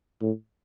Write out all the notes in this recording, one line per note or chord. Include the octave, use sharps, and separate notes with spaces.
A2